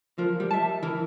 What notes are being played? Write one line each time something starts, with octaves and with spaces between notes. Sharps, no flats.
F3 A#4
G3
E5 A5
E3 A#4